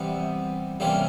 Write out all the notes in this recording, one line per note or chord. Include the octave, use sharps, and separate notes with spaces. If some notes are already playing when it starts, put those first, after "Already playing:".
Already playing: C3 E3 G3 B3
C3 E3 G3 A#3 C#4